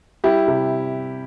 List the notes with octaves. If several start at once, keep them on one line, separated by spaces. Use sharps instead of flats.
G3 E4 G4
C3